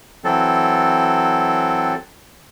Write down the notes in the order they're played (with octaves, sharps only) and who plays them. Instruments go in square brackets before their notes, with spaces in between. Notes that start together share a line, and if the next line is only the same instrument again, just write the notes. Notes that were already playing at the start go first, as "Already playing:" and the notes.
[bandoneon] E3 F#3 C4 A4